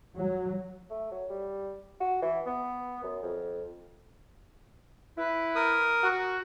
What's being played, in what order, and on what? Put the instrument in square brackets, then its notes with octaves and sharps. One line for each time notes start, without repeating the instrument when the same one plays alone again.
[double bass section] F#3
[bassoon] A3
F#3
G3
F#4
E3
B3
F#2
F2
[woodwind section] E4 B4
[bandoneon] A#4 D#6
[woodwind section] F#4